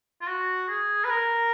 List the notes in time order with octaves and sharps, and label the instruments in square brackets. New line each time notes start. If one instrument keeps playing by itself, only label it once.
[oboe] F4
F#4
G#4
B4
A#4